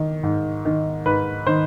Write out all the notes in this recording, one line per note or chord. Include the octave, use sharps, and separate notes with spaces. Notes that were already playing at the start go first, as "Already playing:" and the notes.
Already playing: D#3
G#2
D#3
G#2 B4
D#3 C5